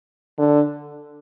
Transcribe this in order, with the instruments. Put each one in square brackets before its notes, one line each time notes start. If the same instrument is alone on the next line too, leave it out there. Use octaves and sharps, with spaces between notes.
[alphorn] D3